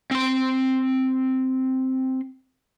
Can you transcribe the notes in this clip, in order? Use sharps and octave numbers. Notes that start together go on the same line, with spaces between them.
C4 C6